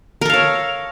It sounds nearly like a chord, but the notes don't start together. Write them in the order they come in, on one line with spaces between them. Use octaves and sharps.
A#4 A4 F5 C#5